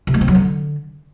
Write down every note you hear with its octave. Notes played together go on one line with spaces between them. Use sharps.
C3
G#3
C4
F#3
D3